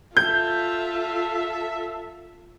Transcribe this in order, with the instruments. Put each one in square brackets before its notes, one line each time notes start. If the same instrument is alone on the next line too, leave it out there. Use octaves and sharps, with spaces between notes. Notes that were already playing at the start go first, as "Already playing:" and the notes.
[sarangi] F4 [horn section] A4 E5 [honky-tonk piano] G6